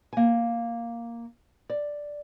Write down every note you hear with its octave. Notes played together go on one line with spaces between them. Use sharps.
A#3 G#5
D5